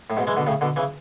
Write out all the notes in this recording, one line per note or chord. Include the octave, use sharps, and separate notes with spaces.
A2
G#2 B2
E3 G#3
B2 D3
A2 C#3
B2 D3
C#3 E3